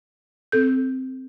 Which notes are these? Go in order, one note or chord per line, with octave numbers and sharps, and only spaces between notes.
C4 A4 G6